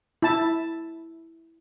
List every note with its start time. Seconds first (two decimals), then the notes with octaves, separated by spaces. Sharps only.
0.22 E4 A5